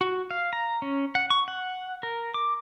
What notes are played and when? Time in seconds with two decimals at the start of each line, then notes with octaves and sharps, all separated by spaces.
0.01 F#4
0.31 F5
0.53 A#5
0.82 C#4
1.15 F#5
1.30 C#6
1.48 F#5
2.03 A#4
2.34 D6